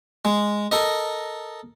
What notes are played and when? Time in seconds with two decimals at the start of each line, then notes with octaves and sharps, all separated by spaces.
0.25 G#3
0.72 A4 A#4 D#5